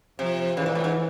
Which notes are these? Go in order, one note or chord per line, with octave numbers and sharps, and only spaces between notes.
C3 F3
C#3 E3
A#2
A2
G#2